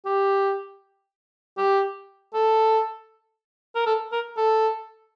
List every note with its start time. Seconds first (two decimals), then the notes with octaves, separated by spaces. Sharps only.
0.05 G4
1.58 G4
2.34 A4
3.75 A#4
3.86 A4
4.12 A#4
4.37 A4